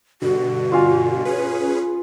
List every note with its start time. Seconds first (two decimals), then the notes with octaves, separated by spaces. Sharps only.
0.22 G2 B2 D3 F#4
0.72 F4 F5 G#5
1.25 C#4 G#4 B4